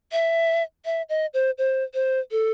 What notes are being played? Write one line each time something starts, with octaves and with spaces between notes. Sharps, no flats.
E5
E5
D#5
C5
C5
C5
A4